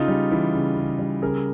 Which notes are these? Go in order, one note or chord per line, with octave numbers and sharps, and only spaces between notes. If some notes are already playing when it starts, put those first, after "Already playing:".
Already playing: C#3 D#4 F4
G3
E3
C#3
C#3
G3
C#3 G#4 A#4